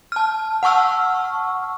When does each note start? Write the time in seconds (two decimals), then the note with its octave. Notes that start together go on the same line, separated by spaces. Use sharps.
0.12 A5 F6
0.63 F#5 A5 C#6 E6 F6